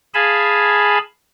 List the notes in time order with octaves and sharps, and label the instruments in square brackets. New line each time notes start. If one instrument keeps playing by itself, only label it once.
[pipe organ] G#4 F5 G#5 A5 B5